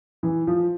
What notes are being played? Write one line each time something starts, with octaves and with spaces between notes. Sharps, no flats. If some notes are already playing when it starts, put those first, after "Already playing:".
E3
F3